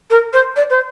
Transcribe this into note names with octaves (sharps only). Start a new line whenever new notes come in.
A#4
C5
D5
C5